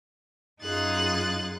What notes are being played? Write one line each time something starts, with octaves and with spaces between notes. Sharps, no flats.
F#2 D#4 F4 G#4 F#6 A6